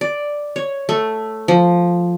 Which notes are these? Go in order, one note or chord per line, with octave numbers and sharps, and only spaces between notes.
D5
C#5
A3
F3